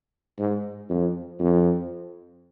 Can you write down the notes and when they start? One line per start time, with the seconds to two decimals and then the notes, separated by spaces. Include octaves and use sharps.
0.39 G#2
0.90 F2
1.40 F2